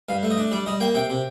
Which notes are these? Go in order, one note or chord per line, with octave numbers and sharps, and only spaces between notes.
G2 F5
A3
D#5
D4
G3 D5
G3 D#5
A#3 G5
C3 G5
C3